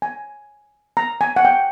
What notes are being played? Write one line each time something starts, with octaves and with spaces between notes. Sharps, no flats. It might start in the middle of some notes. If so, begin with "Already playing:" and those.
G#5
A#5
G#5
F#5
G5